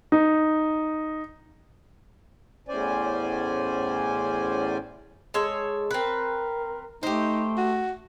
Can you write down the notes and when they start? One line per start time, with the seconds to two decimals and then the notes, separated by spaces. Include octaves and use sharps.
0.12 D#4
2.68 E2 A2 C#4 C5 D5 G#5
5.34 G#3 A4 C#5
5.91 C4 A#4 B4
7.03 A3 D#4 G4 C5
7.57 F#4